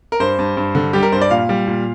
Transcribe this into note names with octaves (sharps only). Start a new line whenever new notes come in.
A#4
G2 C5
G2
G2
D3
G3 G4
A#4
G2 C5
D5
A#2 F5
G3
A#2